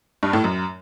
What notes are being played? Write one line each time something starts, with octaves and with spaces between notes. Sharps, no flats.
G2
A2
F#2